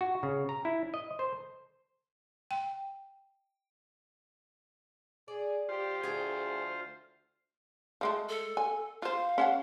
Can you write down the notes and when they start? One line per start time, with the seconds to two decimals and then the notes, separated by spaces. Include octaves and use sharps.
0.01 F#4
0.23 C#3
0.49 A#5
0.65 E4
0.94 D#5
1.19 C5
2.51 G5
5.28 G#4 D5
5.69 F4 G4 C5
6.03 D2 G#4 G5
8.01 F3 G#3 A3
8.29 A4
8.57 G#5
9.02 F4 C5 F5
9.38 C#4 E5 F#5